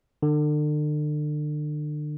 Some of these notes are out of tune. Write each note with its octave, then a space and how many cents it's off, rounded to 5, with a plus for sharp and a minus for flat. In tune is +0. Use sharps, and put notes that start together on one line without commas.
D3 +35